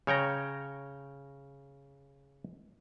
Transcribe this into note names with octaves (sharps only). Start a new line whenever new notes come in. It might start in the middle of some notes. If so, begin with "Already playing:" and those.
C#3 C#5 G5 A#5